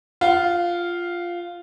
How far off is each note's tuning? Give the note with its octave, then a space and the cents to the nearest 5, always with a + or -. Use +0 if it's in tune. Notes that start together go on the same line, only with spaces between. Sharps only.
F4 -5 F#5 +25